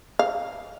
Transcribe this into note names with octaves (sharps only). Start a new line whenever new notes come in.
F5